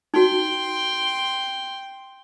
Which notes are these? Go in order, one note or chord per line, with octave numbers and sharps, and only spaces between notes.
D#4 F#4 G5 C6